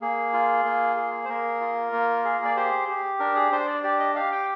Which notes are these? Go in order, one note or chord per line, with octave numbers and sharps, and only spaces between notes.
A#3 G#4
F4
A#3
G#4
C5
A#3 A#4
F4
A#3
G#4
D5
G4 C5
G4
D4 A#4
G#4
D4 C5
D5
G4 D5
D#5
G4 F5
G5